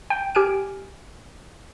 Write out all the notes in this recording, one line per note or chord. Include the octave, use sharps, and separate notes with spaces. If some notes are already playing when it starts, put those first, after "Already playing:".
G5
G4 G#5 F6 D7